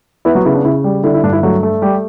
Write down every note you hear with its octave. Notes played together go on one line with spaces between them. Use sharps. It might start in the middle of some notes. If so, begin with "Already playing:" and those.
B3 E4
F#3 F#4
C#3 E4
D4
C#3 E4
G3
D3 E4
E4
G2 D4
E4
F#3 A3 F#4
A3
G3 G4